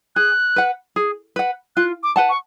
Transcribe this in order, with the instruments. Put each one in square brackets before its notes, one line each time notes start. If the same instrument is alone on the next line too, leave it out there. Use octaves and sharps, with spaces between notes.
[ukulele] G#4 [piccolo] F#6
[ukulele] B4 F#5
G#4
B4 F#5
[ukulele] F4 [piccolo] F#6
[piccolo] D6
[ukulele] B4 F#5 A5
[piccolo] C#6